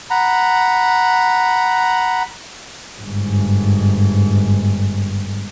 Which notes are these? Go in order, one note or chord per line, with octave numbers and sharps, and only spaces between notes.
F#5 A#5 B5
G1 G#2